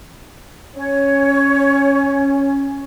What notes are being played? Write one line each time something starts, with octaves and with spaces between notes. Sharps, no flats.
C#4 C#5